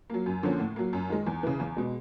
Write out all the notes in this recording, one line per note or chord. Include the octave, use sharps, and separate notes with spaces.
F#3 A#3
F#2
D3 F3 A#3 C#4
A2
F#3 A#3
F#2
D#3 G#3
E2
C#3 E3
E2
B2 G#3